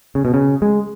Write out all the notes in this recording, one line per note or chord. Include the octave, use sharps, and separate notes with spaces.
C#3
B2
C#3
G#3